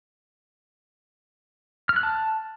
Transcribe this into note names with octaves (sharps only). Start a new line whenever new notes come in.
F6
F#6
A5